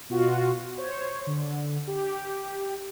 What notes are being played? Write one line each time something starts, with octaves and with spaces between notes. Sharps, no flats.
B2 F4 F#4
C5 C#5
D3
G4